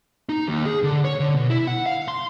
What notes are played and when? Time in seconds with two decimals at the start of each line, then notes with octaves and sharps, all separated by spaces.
0.29 D#4
0.48 D#2
0.66 G#4
0.83 D3
1.05 C#5
1.20 D3
1.35 B2
1.50 E4
1.67 F#5
1.86 F5
2.08 C6